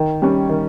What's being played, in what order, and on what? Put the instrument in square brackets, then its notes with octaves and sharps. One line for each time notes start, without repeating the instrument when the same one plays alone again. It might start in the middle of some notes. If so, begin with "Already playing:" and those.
Already playing: [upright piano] D#3
G3 C#4
D#3